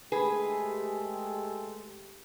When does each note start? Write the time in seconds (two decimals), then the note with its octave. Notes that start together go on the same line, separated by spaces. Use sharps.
0.12 G#3 A3 G4 G#4 B4